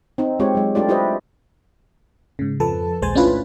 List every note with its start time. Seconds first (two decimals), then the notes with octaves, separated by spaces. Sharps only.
0.18 C4 D#4
0.40 G#3 C4 F4 G4 C#5
0.55 F#3 G#3
0.75 A3 D4 F4 G4 D5
0.89 E4 F4 G4 B4 C5 D#5
2.39 G#2 C#3
2.60 F2 F3 A4 B4 A5
3.02 A#1 D#2 G#3 C5 G#5 A6
3.15 A3 C#4 D4 E4 F4 B4
3.27 A2 B5